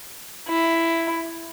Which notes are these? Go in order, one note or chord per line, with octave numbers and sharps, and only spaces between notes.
E4